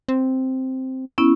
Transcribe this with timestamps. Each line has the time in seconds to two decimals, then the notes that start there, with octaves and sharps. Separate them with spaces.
0.08 C4
1.18 B3 C#4 E4